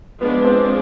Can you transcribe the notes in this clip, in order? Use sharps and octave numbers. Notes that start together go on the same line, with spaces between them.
F3 G#3 B3 D4
C4